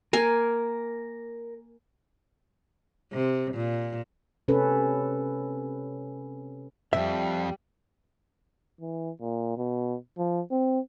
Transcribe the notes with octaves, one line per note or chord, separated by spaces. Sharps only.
A#3 A#4 G#5
C3
A#2
C3 C#4 A4 B4
F2 G#2 G3 E5
E3
A#2
B2
F3
C4